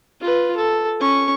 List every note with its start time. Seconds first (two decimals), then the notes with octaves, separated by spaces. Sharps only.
0.21 F4 B4
0.56 A4
1.00 C#4 C#6